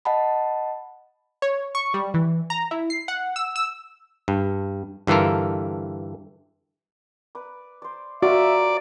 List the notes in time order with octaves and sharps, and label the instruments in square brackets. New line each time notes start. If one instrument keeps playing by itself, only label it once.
[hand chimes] D#5 F#5 A5 B5
[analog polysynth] C#5
C#6
G3
E3
A#5
E4
C7
F#5
E6
E6
[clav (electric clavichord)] G2
G2 D3 E3 F4 A4 A#4
[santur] B4 D5
C5 D5
[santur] F4 A#4 A#5 [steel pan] F#4 [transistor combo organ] D5 [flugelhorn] E5